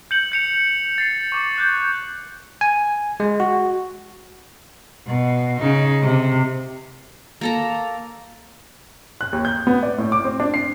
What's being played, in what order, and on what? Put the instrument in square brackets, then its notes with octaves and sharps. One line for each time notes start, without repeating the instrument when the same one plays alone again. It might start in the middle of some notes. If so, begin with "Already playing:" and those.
[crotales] G6 C#7 F#7
G6 C#7 F7
A6 C7
C#6 D6 F7
F#6 G6
[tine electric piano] G#5
G#3
F#4
[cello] B2
C#3 D#4
C3
[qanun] A#3 A4 A#5
[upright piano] F#6
D#2
G6
B3
D5
A2
D6
C4
D4
C7